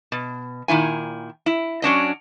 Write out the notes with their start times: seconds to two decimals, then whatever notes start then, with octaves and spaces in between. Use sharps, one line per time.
0.12 B2
0.68 A#2 D#3 E4 G#5
1.46 E4
1.82 F#3 C#4 D4 D#5